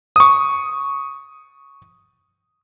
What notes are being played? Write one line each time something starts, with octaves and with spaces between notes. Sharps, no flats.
C#6 D#6